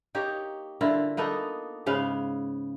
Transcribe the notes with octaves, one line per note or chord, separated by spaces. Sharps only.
A#3 D#4 G4 C#5
D3 E4 F4 A#4
A#3 B3 D#4 A4
G#2 C#3 B3 F5